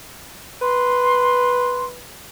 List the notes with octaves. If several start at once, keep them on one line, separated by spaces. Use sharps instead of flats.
B4 C6